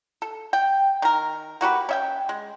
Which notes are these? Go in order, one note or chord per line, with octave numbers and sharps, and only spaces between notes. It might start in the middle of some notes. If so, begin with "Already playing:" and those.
A4
G5
D#3 A#4
A#3 F#4 G4 B4
C#4 E5 G5
G#3